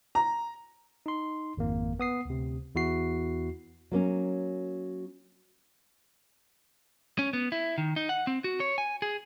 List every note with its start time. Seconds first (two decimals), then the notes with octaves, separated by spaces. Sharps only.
0.15 A#5
1.06 D#4 C6
1.57 G#1 F2 A#3
1.99 B3 D#6 C7
2.25 D2 C3
2.75 E2 E4 F#4 C7
3.91 F#3 A#3 C#4
7.19 C#4
7.33 B3
7.52 E4
7.78 D#3
7.96 D#4
8.09 F#5
8.27 C4
8.44 F#4
8.60 C#5
8.78 G#5
9.02 G#4